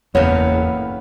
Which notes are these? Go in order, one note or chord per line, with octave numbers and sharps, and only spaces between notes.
F#1 E2 A2 A#3 B3 C#5